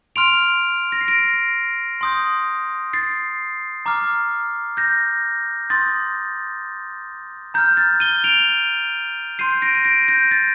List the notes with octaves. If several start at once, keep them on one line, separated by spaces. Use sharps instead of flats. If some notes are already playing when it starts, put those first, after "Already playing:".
C6 F6 D7 F7
A#6
C7
A#6 D7
C6 D#6 G6
A6 C7
A#5 D6 F6
G6 A#6
C6 D#6 G6 A6
A#5 F6 G6
A6
D#7 G7
D7 F7
C6 G6 C7 D#7
A#6 D7
D#7
A#6 D7
G6 A#6
A6